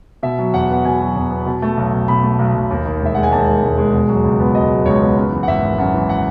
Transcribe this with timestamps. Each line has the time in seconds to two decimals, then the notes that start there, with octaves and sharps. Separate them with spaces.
0.23 B2 E5
0.39 F#3
0.54 E2 F#5
0.70 B3 F#5
0.85 B2 G#5
1.00 F#3
1.16 E2
1.31 B3
1.46 B2
1.62 A3
1.77 B1
1.93 B1
2.08 B2 B5
2.23 A3
2.39 B1
2.55 B1
2.70 D#2
2.85 D#3
3.01 E1 E5
3.14 G#3 F#5
3.23 G#5
3.32 D#2 A5
3.47 D#3
3.63 E1
3.78 G#3
3.94 B2
4.09 F#3
4.24 C#2
4.40 B3
4.55 B2 D#5
4.71 F#3
4.86 C#2 C#5
5.01 B3
5.16 F#2
5.32 E3
5.43 F#5
5.48 G#1 E5
5.63 G#1
5.78 F#2 F#5
5.94 E3
6.09 F#5